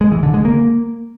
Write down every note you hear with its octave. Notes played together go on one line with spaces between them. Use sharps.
G#3
E3
D3
G#3
A#3